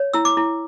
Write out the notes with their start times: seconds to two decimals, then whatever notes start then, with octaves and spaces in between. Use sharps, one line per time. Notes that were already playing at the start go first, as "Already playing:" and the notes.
Already playing: C#5
0.14 E4 E6
0.25 D6
0.37 E4